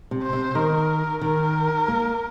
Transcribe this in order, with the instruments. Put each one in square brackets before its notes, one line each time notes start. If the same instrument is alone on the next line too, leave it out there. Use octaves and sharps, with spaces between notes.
[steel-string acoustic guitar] C3
[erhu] C5
[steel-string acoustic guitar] C3
[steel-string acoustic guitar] D#3 [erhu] A#4
[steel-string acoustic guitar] D#3 [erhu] A#4
[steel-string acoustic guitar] A#3